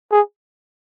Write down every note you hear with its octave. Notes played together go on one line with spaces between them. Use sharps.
G#4